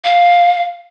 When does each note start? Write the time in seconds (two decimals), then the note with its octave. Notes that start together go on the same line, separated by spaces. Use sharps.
0.04 F5